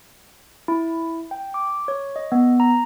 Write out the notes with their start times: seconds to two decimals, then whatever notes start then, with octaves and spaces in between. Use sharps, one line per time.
0.68 E4
1.31 G5
1.54 D6
1.88 C#5
2.16 D#5
2.32 B3
2.60 A#5